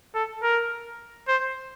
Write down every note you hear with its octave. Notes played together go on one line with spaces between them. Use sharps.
A4
A#4
C5